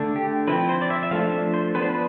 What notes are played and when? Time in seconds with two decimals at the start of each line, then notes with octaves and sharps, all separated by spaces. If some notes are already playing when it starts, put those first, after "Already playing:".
Already playing: D3 A3 D4
0.16 G4
0.48 F3 C4 E4 B4
0.69 C5
0.82 D5
0.90 E5
1.03 E5
1.11 F3 A3 D4 F5
1.32 E5
1.54 C5
1.75 F3 B3 D4 B4
1.82 C5
1.89 B4